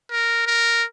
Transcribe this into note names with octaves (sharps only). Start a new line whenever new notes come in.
A#4
A#4